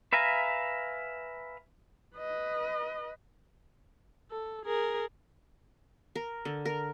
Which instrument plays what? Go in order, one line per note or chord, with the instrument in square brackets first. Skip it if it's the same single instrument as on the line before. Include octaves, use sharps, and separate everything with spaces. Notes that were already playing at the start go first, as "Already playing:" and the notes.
[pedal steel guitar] B4 E5 F5 G#5 A#5
[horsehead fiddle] B4 D#5
[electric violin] A4
G#4 A#4
[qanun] A#4
D3
A#4